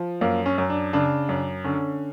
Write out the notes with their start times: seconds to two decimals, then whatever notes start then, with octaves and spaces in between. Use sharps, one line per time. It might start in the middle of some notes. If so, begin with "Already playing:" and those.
Already playing: F3
0.21 F#2 A#3
0.46 C#4
0.58 F#2
0.70 D4
0.93 C#3 D4
1.29 F#2
1.64 D3 C#4